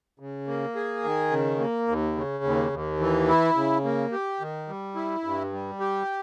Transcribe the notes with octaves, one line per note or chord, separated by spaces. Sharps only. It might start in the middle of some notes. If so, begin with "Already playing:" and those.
C#3
A#3
G#4
D#3
C#3
A#3
D#2
C#3
D#2
D#2
E3
E4
C#3
A#3
G4
D#3
G3
E4
G2
G3
G4